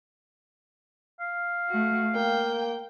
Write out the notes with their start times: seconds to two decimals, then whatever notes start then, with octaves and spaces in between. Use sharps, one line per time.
1.20 F5
1.69 A3 F#4
2.15 A#3 G5